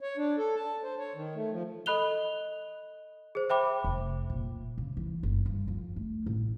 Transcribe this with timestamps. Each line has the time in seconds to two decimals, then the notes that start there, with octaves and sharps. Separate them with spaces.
0.01 C#5
0.17 D4
0.38 A4
0.56 A5
0.83 C5
0.99 C#5
1.15 D#3
1.35 A3
1.51 F3
1.86 A4 D#5 B5 F#6 F7 G7
3.35 G#4 C5
3.49 C5 E5 G5 B5 D6
3.84 F1
4.30 A#2
4.78 C#3
4.97 E3
5.23 F#1
5.46 G2
5.68 F2
5.96 A3
6.26 A1